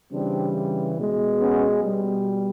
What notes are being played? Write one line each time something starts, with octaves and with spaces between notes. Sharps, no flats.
C#3 E3 G3 C4 D4
B2 G#3
B3 C#4
B2 G3